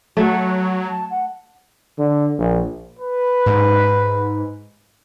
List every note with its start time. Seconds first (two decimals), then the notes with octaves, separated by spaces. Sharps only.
0.17 F#3 A3 F#4
0.90 A5
1.10 F#5
1.98 D3
2.39 A#1
2.99 B4
3.46 G#2